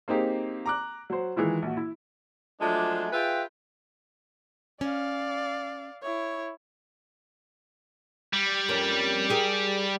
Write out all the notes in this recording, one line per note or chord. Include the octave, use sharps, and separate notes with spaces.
A#3 C4 D#4 G4 G#4
A#5 D6 F#6
F#3 C5
D#3 E3 G#3 E4 F4
A#1 F#4
E4
F3 F#3 G#3 A3 D4
F4 G#4 B4 E5 G5
C#4 D5 F5
E4 C#5
G3
F2 A#3 C#4
G4 G#4 A#4